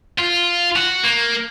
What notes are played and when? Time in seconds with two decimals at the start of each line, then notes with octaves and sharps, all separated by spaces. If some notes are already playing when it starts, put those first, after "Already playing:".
0.18 F4
0.77 F#4
1.04 A#3